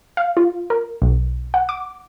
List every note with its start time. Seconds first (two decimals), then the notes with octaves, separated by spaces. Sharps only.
0.17 F5
0.37 F4
0.70 A#4
1.02 B1
1.54 F#5
1.69 D6